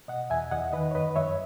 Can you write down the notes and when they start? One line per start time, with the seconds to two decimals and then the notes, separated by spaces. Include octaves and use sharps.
0.08 B2 D#5 F#5
0.30 E2 E5 G#5
0.51 E2 D#5 F#5
0.73 D#3 B4 D#5
0.91 C#5
0.95 F#2 B4 D#5
1.16 F#2 C#5 E5